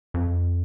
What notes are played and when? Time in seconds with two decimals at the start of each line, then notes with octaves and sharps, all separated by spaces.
0.14 F2